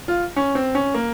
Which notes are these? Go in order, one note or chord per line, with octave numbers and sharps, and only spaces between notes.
F4
C#4
C4
C#4
A#3